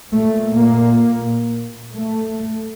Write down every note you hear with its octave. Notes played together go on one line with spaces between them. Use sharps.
A#2 A3
A#3
A3